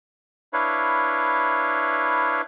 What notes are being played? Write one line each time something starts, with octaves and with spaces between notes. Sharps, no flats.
D4 E4 B4 C#5 F5